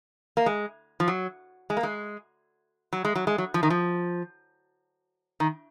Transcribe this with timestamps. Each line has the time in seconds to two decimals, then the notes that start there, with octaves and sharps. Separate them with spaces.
0.37 A#3
0.46 G#3
1.00 F3
1.08 F#3
1.70 G#3
1.77 A#3
1.83 G#3
2.93 F#3
3.05 G#3
3.15 F#3
3.27 G#3
3.38 F#3
3.54 F3
3.63 D#3
3.70 F3
5.40 D#3